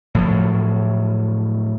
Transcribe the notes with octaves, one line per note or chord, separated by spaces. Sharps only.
A2 F3 F#3